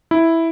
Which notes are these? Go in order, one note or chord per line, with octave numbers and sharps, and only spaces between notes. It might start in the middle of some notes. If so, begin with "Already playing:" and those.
E4